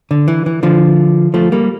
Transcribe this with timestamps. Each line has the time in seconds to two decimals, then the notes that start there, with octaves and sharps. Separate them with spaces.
0.11 D3
0.28 E3
0.46 E3
0.63 D3 F3
1.34 F3 A3
1.52 G3 A#3